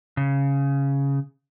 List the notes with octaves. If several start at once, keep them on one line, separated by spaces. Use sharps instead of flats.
C#3